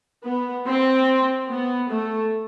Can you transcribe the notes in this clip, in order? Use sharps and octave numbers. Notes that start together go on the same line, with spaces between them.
B3
C4
B3
A3